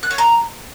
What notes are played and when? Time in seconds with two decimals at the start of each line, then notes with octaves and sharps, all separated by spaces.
0.03 F#6
0.11 C#5
0.18 A#5